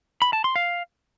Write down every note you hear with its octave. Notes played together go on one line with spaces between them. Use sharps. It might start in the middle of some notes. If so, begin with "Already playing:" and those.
B5
A5
C6
F5